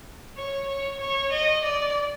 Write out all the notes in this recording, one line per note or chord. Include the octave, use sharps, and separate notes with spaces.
C#5
C#5
C#5
D#5
D5